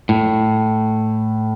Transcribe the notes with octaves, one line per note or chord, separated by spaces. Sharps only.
A2